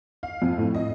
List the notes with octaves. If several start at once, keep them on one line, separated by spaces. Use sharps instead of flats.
F5
F2
A2
D#5